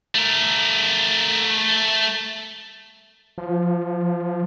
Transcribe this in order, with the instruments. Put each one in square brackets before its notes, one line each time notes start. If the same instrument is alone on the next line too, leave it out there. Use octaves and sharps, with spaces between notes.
[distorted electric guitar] A3 A#4
[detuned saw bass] F3